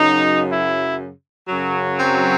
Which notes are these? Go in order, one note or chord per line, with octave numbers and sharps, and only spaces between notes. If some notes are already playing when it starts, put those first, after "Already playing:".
Already playing: F#2 C#3 F#3 D#4
E4
F#2 C#3 F#3
C4